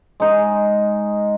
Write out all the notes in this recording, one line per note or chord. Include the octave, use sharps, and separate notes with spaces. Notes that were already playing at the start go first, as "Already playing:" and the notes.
G#3 D#4